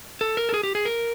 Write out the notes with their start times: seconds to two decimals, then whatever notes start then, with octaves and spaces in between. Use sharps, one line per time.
0.21 A4
0.37 A#4
0.49 A4
0.54 G#4
0.63 G4
0.75 G#4
0.85 A#4